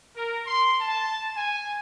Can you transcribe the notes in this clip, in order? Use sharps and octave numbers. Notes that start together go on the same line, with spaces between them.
A#4
C6
A5
G#5